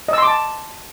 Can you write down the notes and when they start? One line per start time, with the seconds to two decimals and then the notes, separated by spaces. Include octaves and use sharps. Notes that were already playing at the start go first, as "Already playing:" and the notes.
0.08 D#5
0.13 E6
0.18 C6
0.23 D6
0.27 A5